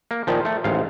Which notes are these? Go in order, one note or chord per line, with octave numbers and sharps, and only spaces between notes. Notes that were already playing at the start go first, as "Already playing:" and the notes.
A#3
A#2 D#3 F3
A3
A1 G#2 F5